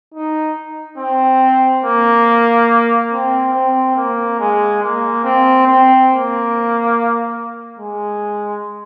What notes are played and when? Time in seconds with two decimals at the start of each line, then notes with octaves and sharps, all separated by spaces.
0.14 D#4
0.98 C4
1.84 A#3
3.12 C4
3.54 C4
3.96 A#3
4.40 G#3
4.82 A#3
5.24 C4
5.66 C4
6.10 A#3
7.79 G#3